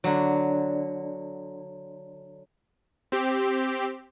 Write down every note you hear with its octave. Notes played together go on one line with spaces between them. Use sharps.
D3 F#3
C4 G4